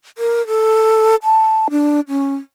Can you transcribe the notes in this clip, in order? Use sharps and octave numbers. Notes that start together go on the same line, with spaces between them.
A#4
A4
A5
D4
C#4